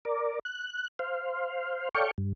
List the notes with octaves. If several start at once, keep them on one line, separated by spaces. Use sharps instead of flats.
A#4 D5
F#6
C5 F5
A4 C#5 D5 F5 G5 C#6
G2